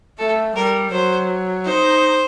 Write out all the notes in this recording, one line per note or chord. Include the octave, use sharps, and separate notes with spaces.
A3 A4
G3 A#4
F#3 C5
D#4 C5